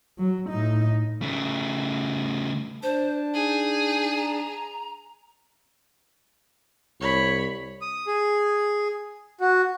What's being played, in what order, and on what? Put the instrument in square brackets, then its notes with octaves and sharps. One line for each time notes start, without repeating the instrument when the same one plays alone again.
[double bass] F#3
A2 D#4
[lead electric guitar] C#3 A3
[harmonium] D4 A5 [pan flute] C5
[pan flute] D#4 [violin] G#4
[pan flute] A#5
[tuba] C2 [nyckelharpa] C#5 B5
[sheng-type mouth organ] D#6
G#4
F#4